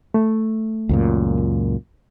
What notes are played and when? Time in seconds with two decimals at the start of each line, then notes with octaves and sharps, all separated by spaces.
0.14 A3
0.89 C#2 F#2 A#2